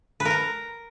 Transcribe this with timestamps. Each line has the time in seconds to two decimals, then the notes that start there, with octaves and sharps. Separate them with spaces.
0.20 B4
0.25 A#4
0.31 A#5